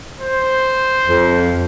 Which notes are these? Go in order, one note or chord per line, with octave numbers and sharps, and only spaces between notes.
C5
F2